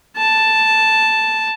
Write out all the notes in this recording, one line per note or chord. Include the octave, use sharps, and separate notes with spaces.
A5